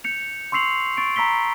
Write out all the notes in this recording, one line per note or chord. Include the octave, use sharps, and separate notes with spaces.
G6 C#7 F7
C6 C#6 E6 C7 F7 F#7
C#6 A6 D7
A#5 B5 E6 B6 G7